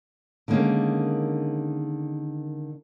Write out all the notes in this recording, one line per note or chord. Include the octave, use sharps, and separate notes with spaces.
D3 D#3 G#3 A#3 C#4